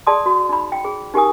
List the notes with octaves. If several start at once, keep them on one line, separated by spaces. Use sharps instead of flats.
G#4 D5 A5 C6 D#6
F#4
D#4 B5
G5
G#4
D#4 G4 A#4 G#5 D#6